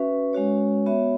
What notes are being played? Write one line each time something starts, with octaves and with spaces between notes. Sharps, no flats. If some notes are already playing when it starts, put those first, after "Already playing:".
Already playing: C#4 F#4 B4 E5
G#3 C#4 F#4 C#5
B3 F#4 C#5 E5